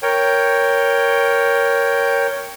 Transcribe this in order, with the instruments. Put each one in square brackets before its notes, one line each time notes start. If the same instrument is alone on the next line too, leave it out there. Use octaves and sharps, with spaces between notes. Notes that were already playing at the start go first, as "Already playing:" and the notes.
[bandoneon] A#4 C#5 G5